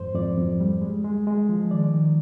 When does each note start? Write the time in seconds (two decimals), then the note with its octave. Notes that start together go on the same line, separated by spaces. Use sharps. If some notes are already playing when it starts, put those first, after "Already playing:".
Already playing: F2 G#2 C5
0.15 F2 D5
0.37 F2
0.60 G3
0.82 G#3
1.04 G#3
1.27 G#3
1.49 F3
1.71 D#3 D5
1.93 D#3